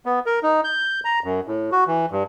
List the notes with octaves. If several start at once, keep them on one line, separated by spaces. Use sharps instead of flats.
B3
A#4
D#4
G6
A#5
F#2
A2
F#4
E3
G2